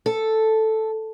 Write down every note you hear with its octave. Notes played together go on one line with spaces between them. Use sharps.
A4